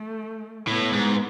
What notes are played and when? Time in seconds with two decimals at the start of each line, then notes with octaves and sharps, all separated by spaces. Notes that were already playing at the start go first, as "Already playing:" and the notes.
Already playing: A3
0.68 A2 B3
0.93 G#2